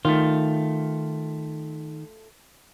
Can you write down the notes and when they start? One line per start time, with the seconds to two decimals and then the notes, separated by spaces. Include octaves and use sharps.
0.05 D#3 A3 F4